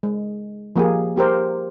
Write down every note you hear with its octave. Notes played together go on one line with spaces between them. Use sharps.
G#3
F3 A#3 G4 G#4
A#3 G4 A#4 C5